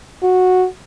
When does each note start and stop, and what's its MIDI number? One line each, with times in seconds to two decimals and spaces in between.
0.23 0.67 66